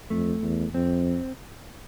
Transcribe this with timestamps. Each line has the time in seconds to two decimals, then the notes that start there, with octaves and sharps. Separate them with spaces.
0.10 F2 A3
0.43 E2
0.74 F2 C4